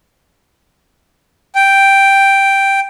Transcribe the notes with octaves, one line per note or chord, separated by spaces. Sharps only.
G5